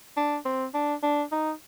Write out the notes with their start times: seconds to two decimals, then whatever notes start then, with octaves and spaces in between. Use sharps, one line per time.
0.17 D4
0.45 C4
0.74 D4
1.03 D4
1.32 D#4